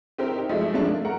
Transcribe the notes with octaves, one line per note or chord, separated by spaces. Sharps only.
C4 E4 G4 A#4 C5
D#4 G4
F3 F#3 G#3 A3 E4 D#5
F3 G3 G#3 A#3 C#4 D4
A3
A#4 F#5 A#5